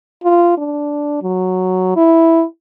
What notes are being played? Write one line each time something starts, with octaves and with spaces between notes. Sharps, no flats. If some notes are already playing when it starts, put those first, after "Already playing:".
F4
D4
F#3
E4